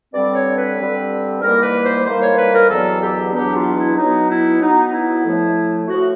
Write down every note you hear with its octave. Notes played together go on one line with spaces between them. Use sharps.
G2 D3 G3 C4 D5
C#5
B4
G2 D3 G3 C4
G#2 E3 G3 A#3 A#4
B4
C5
G#2 E3 G3 A#3 C5
C#5
B4
A#4
E2 B2 F#3 B3 D4 A4
G4
E2 B2 F#3 B3 D4 G4
F4
E4
B2 F#3 B3 D#4
E4
B2 F#3 B3 D#4
E4
A2 F3 A3
A2 F3 A3 F#4